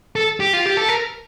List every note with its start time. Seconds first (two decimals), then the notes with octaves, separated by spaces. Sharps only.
0.16 A4
0.40 G4
0.53 F4
0.66 G4
0.77 A4
0.89 A#4